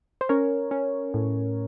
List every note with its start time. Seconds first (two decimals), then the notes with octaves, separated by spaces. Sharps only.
0.21 C5
0.29 C#4 A#4 C#5
0.71 C#4
1.14 A2